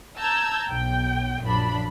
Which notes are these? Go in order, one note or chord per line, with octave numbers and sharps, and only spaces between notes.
A5 A#5 E6 G6 G#6
B1 G5
A#1 F#2 F3 D4 B5